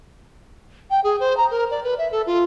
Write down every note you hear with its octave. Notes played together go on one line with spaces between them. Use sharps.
G5
G#4
C5
A#5
A#4
D5
B4
E5
A4
F4